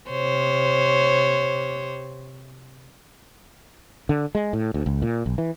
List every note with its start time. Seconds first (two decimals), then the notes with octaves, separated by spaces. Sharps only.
0.10 C3 C5 C#5
4.09 D3
4.35 G#3
4.53 A2
4.74 D2
4.86 C#2
5.02 A#2
5.26 B1
5.38 E3